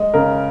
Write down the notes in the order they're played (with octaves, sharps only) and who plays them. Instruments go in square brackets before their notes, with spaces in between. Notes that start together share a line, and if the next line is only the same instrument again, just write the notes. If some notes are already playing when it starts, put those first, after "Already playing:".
Already playing: [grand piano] G#3 [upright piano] D#5
[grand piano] C#3 [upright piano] A#4